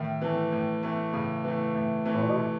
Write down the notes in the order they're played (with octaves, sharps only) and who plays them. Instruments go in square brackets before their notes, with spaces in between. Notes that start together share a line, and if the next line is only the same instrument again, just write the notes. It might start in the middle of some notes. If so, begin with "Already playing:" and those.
Already playing: [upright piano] A2 [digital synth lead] D#3
[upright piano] E3 A3
A2
E3 A3
[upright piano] A2 [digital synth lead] C#3
[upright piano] E3 A3
A2
E3 A3
[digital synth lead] A2
A#2
B2
C3